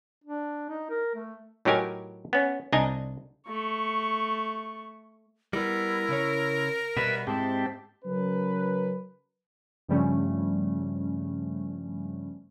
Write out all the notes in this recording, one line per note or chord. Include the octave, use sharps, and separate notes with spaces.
D4
D#4
A#4
A3
A2 F#3 D#4 G4 A#4 G#5
B3 C#4
C2 D4 D#4 D#5 G#5 A#5
A3 C#6
G3 B3 E4 A#4
C#3 C#4 C#5
B2 G3 B3 B4 E5 B5
G#2 G#3 C4 E4 G4 A5
C#3 F#3 C#4 A#4 B4
G2 C#3 F3 G3 A3 C#4